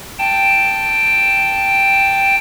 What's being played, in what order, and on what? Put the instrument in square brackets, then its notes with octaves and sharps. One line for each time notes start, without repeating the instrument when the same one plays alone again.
[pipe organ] G5 A5